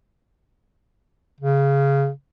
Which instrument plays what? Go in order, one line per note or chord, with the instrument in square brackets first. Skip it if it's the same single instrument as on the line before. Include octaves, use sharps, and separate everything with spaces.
[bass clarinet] C#3